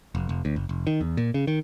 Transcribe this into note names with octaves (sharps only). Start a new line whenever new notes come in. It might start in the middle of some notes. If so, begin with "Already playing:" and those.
F1
F1
D2
F#1
F1
D#3
E2
A#2
C#3
D#3